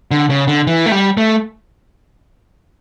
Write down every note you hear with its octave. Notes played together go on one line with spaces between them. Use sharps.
D3
C#3
D3
E3
A3
G3
A3